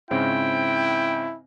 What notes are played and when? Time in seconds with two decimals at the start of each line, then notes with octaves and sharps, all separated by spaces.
0.11 G#2 C#3 C4 E4 G5